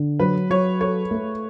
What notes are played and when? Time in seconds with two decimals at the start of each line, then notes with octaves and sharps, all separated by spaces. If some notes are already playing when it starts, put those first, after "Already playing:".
Already playing: D3
0.20 F#3 B4
0.50 F#3 C#5
0.81 A4 C#5
1.11 A3